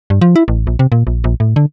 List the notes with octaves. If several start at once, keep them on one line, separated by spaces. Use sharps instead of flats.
G2
F3
E4
A1
A#1
C3
A#2
A#1
A#1
A2
D3